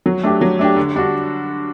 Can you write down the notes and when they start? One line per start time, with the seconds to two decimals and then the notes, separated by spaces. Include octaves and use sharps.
0.06 F#3
0.23 A3 D4 G4
0.41 F#3
0.59 A3 D4 G4
0.76 D3
0.95 G3 D4 F#4